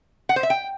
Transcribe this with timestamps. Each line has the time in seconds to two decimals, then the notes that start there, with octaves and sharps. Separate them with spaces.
0.29 F#5
0.36 C5
0.43 E5
0.50 G5